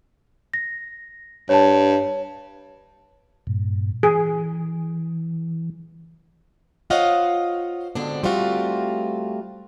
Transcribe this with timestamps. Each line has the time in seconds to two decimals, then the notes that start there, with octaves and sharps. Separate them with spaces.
0.54 A#6
1.49 G2 C#5 A5
3.47 G2 A#2
4.03 E3 G#4
6.90 F4 C5 C#5 D#5 F5 F#5
7.95 G#2 B2 D3 C4 D4
8.24 G3 A3 C4 F4 F#4